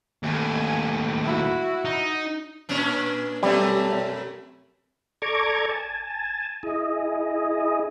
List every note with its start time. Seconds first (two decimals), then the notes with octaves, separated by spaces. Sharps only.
0.23 D#2 A2 G#5
1.23 E4 F#4
1.85 D#4
2.69 A#2 C#4 D4
3.43 F#2 B2 G3 A3
5.22 A4 D5 A#5 C#6 D6 G#6
5.69 G#5 A5
6.63 E4 G#4 D#5